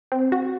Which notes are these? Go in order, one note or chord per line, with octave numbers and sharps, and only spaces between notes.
C4
F#4